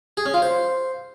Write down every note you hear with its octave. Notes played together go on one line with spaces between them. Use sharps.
G#4
C#4
F4
C5